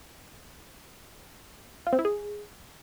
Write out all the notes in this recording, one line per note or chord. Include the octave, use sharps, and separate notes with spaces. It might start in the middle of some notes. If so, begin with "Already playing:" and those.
F4
C4
E4
G#4